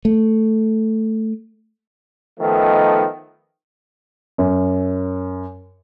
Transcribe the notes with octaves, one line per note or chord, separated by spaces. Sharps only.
A3
D#3 F3 A3 B3 D#4
F#2